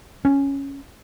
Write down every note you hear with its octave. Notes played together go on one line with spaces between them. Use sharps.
C#4